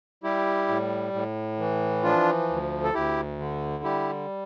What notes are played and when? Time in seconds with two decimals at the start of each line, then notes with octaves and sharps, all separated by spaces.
0.24 G3 E4 G4
0.68 A2
1.13 A2
1.59 E3
2.03 F3 D4 F4
2.49 D2
2.84 A4
2.94 D2 E4 G4
3.39 D3
3.84 G3 E4 G4